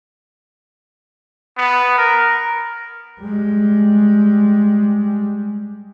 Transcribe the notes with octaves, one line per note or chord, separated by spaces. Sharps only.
B3
A#4
G3 G#3